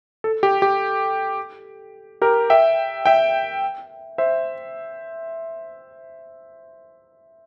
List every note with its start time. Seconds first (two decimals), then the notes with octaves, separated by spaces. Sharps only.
0.24 A4
0.43 G4
0.62 G4
2.22 G4 A#4
2.50 E5 G5
3.06 E5 G5
4.18 C5 E5